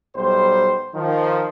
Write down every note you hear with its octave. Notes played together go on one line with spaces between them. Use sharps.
B1 G3 C5
D#3 F3